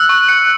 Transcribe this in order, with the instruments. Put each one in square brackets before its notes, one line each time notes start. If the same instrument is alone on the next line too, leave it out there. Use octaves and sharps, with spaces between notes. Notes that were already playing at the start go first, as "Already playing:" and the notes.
Already playing: [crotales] E6 [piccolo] F#6
[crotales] C#6
C#7